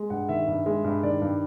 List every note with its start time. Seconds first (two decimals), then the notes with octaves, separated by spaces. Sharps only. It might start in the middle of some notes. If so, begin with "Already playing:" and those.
Already playing: G#3
0.10 G2 F#5
0.29 D#3 E5
0.48 G2
0.66 G#3
0.84 G2
1.03 D#3 D5
1.22 G2